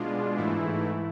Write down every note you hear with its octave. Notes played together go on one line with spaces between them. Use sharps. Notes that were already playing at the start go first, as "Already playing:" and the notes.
Already playing: B2 G#3 D4 F4
G#2 E3 A3 E4